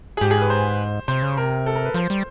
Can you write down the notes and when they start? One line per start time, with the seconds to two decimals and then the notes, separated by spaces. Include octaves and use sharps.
0.17 G#4
0.21 G#2 G4
0.31 G#4
0.41 B4
0.50 C5
1.08 C3 C5
1.22 C#3
1.37 C3 A#4
1.66 A4
1.76 A#4
1.85 B4
1.94 F3 C5
2.10 G3